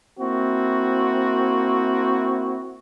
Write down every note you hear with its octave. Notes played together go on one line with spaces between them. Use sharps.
A#3 C4 E4 F#4